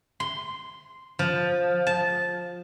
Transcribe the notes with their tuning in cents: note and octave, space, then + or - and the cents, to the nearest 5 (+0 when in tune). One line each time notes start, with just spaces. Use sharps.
C6 -5
F3 +10
A5 -10